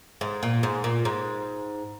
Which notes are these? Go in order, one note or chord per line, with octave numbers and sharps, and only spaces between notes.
G#2
A#2
G#2
A#2
G#2